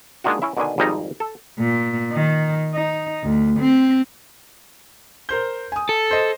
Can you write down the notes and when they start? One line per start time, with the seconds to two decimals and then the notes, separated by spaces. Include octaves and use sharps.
0.24 G#3 A#3 D4 D#4 F4 F#4
0.42 C#4 E4 E5
0.57 B2 D3 D#3 D4 G#5
0.78 G#1 F2 G3 G#3 D#4
1.20 A4
1.59 A#2
2.12 D#3
2.74 D#4
3.23 D2
3.60 C4
5.29 A#4 C5 G6
5.72 G#5 D#6
5.89 A4
6.11 C5 D#5